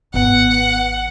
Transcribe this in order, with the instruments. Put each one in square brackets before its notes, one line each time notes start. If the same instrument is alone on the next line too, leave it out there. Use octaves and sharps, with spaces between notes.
[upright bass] G#1 [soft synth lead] B3 [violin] F#5